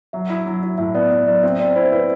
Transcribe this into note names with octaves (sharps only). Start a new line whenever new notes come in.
F#3 E5
E4
F#3
E4
A2 E5
B3 D5
B3 D5
F#3 D5
C4 E5
C4 D5
E4 C5
E4 B4